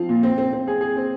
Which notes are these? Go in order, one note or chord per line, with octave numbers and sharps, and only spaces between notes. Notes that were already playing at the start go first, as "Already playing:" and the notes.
Already playing: F3 C4 F4
A#2
C4
C4
C4
G#4
G#4
C4